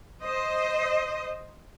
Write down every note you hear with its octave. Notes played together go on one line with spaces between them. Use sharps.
C5 D#5